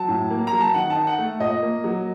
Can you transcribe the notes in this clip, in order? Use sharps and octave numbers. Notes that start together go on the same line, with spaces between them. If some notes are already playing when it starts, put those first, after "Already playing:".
Already playing: F#3 A5
A2
A#3
A#5
F#3
A5
D#3 F#5
A5
D#4
F#5
A3
A#2 D#5
A#3
F#3